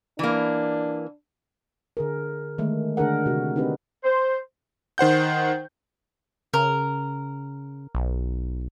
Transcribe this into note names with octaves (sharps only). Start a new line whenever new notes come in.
E3 A#3 D4
D3 G#4 A#4
D#3 G#3 A3
D3 A3 D4 G#4 A#4 F#5
C3 F#4
C4 D4 D#4 G4 B4
C5
D#3 C5 F#5 G6
C#3 A#4
B1